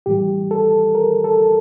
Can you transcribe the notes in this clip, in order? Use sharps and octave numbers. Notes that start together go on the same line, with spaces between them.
A2 E3 G3 G4
A4
A#4
A4